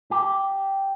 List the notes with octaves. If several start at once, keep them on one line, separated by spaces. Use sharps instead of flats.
G4